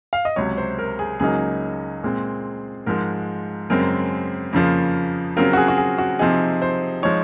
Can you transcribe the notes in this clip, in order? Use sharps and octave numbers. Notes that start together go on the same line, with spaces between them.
F5
D#5
C#2 C3 F#3 C#5
C5
A#4
G#4
C#2 C#3 F#3 A#3 D#4 G#4
A#2 G#3 C4
G#2 F3 G#3 A#4
F#2 C#3 G#3 C4 A#4
F2 C#3 F3 A#3 F4
C#3 F#3 C4 F4 A#4
F#4
G#4
F#4
G#4
F#4
C3 F3 C4 D#4 G#4
C5
F3 G#3 D#4 C#5